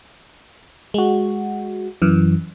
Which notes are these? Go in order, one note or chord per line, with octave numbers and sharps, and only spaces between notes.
G#3 F#4
F#2 E3